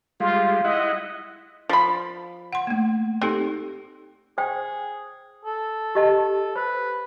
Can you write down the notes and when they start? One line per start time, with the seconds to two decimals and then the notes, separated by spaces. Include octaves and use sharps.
0.20 G3 G#3 F4
0.64 E4 D#5 F#5
1.69 F3 B5
2.53 F#5 C6
2.67 A3 A#3
3.22 C4 D#4 G4 A4
4.38 G#4 C5 G5
5.45 A4
5.95 G4 D#5 A5
6.56 B4 C5